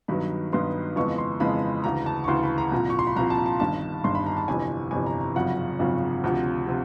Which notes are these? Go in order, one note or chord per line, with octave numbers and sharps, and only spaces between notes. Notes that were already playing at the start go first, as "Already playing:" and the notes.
G2 D#3 F#3 B3 B5
G2 D#3 F#3 B3 C6
F2 C#3 E3 G#3 B3 C#6
C6
F2 C#3 E3 G#3 B3 B5
D2 C#3 E3 A#5
A5
C#6
D2 C#3 E3 C6
B5
A#5
C2 A#2 F3
C#6
C6
B5
C2 A#2 F3 A#5
A5
A#5
A5
G1 G2 D#3 A5
G1 G2 D#3 C6
B5
A#5
A5
G1 F2 C3 E3 G#5
G1 F2 C3 E3 G#5
A#5
A#5
G#1 F#2 C#3 F3 F#5
G#1 F#2 C#3 F3
D2 C3 F3
C3 F3